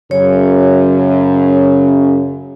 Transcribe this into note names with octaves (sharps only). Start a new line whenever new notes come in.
F#2 C#3 C#5